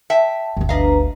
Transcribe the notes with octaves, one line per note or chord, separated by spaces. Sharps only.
E5 G5 A5
G1 D2
D4 B4 D#5 F5 A#5